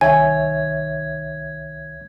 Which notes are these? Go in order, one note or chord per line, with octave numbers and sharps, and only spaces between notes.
C2 D#3 C#5 E5 G#5 G#6